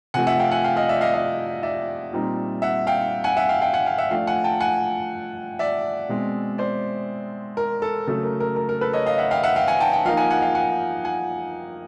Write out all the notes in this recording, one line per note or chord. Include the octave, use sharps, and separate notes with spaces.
C3 F3 A3 F#5 G#5
E5 F#5
F5 G5
F#5 G#5
F5 G5
D#5 F5
D5 E5
D#5 F5
D#5 F5
D5 E5
A#2 G3 C4 D#4
E5 F#5
F5 G5
F#5 G#5
E5 F#5
F5 G5
F5 G5
F#5 G#5
F5 G5
E5 F#5
F3 A3 D4 F5 G5
F#5 G#5
G5 A5
F#5 G#5
D5 E5
B2 G#3 C4
C5 D5
A#4
A4
C#3 F#3 A3 A4
A#4
A#4
A#4
A#4
A4 B4
C#5 D#5
D#5 F5
E5 F#5
F5 G5
E5 F#5
F5 G5
F#5 G#5
G5 A5
G5 A5
F3 A#3 D#4 F5 G5
F#5 G#5
F#5 G#5
F5 G5
F#5 G#5
F#5 G#5